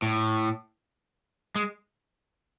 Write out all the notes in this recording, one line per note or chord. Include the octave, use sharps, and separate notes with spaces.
A2
G#3